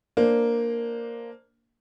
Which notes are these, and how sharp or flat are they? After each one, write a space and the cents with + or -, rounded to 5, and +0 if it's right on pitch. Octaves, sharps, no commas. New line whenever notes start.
A#3 +0 D4 +0 C5 +0